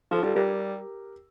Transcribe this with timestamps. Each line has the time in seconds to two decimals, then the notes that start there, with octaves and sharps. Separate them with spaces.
0.11 F3 F4 A4
0.23 G3 F4 A4
0.35 G3 G4 A#4